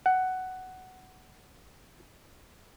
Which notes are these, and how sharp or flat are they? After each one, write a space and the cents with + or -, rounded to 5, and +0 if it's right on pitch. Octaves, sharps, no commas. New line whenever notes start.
F#5 +10